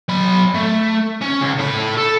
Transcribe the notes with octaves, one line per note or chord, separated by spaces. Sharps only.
F#3 B5
A3
C#4
C#2
A2 B5
A4